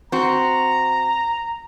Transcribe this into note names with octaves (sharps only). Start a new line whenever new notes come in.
C4 F#4 A#5